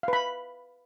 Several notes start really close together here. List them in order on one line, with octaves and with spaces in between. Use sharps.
F5 B4 B5